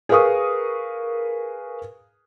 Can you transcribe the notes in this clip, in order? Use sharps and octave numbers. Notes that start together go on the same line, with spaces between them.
G#4 A#4 B4 F5 C#6 D#6